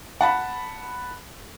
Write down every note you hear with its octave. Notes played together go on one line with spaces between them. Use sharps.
F#5 A5 B5